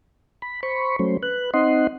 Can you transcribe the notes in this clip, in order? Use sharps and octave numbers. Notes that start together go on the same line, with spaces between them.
B5
C5 B5 C#6
F#3 A3 C#4 C5
B4 F#6
C4 D#4 D#5 F#5 C6